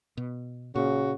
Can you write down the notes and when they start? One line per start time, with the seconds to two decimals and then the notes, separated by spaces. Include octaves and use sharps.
0.17 B2
0.75 A#2 C#3 F#4